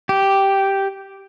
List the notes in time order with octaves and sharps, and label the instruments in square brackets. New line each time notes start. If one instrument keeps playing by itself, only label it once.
[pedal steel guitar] G4